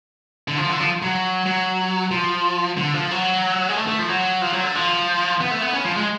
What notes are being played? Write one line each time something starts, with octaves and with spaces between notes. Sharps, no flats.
D3
F3
D3
F3
F#3
F#3
F3
D3
F3
F#3
G#3
A3
A3
F3
F#3
F3
F#3
D3
F3
B3
A3
B3
C#4
F3
G#3